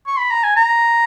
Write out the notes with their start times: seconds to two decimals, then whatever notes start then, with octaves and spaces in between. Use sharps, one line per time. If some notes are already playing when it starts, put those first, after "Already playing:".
0.07 C#6
0.18 B5
0.31 A#5
0.43 G#5
0.56 A#5